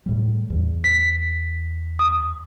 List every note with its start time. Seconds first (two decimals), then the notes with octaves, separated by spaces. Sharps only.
0.06 A2 G3
0.50 E2
0.84 B6
1.99 D#6